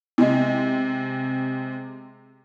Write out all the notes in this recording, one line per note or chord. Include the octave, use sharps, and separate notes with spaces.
C3 G#3